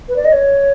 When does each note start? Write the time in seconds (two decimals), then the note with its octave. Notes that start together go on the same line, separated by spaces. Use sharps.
0.08 B4
0.16 D5
0.25 D#5
0.32 C#5